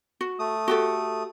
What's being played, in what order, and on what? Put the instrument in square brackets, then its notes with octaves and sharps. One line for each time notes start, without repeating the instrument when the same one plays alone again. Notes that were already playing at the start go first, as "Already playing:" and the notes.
[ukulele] F#4
[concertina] A3 D#6
[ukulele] F#4 G4 A4